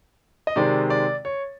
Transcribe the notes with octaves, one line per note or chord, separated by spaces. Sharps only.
D#5
C3 D#3 G#3 C4 D5
D5
C#5